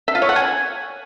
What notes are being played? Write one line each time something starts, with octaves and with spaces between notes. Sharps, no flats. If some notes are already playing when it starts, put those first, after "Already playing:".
E5
F4
C#5
F#5
G#5